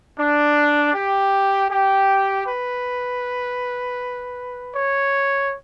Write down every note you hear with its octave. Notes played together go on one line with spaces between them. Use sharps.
D4
G4
G4
B4
C#5